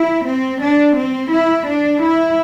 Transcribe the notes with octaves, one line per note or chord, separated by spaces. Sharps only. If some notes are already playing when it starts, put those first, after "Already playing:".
Already playing: E4
C4
D4
C4
E4
D4
E4